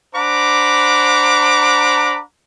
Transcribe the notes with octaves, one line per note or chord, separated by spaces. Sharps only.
D4 C5 F#5 A#5 B5 D6